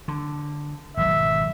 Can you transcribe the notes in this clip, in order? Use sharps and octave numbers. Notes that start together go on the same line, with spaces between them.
D3
G#1 B2 F#3 E5